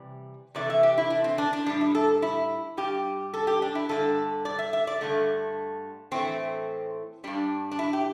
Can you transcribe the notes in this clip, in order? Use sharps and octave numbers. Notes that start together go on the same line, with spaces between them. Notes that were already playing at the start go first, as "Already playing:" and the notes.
Already playing: C3 E3 G3
C3 E3 A3 D5
E5
G4
E4
D4
C4
D4
D4
A2 G3 D4
E4
A4
E4
G2 G3 G4
A4
G4
D4
E4
G2 D3 G3 A4
D5
E5
E5
D5
G2 D3 A3
A2 E3 A3 C4
G2 G3 D4
D4
E4
G4